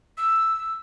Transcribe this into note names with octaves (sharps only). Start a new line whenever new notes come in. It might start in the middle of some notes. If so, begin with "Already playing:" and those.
E6